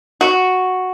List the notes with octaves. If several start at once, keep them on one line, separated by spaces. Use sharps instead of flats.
F#4